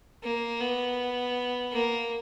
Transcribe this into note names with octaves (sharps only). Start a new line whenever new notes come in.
A#3
B3
A#3